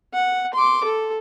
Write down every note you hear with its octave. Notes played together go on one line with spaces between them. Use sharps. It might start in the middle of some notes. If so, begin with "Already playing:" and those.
F#5
C6 D6
A4